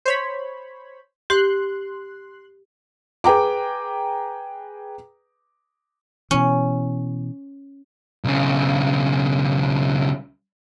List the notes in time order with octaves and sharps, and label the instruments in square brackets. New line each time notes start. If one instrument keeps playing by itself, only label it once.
[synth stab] C5 C#5 B5
[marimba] G4 [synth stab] C6 F#6
[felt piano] G#4 B4 G5 A#5 D6
[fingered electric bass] B2 E3 [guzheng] C#4
[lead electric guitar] B1 C#3